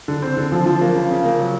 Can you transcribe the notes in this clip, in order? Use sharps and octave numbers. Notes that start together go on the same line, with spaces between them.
D3
C4
D3
F3
F3
A#3
C#3
C#3
A#3
F#3